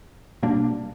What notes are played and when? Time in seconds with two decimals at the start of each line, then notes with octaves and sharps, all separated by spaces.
0.43 B2 G3 A#3 D4